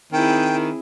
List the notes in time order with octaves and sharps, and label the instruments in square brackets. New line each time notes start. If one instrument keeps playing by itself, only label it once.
[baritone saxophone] D#3 [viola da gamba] C4 E4 G#4 [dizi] G5